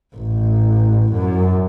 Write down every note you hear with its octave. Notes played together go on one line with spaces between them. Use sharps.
A1
F#2